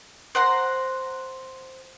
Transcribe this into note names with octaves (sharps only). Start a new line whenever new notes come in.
C5 F#5 A#5 C6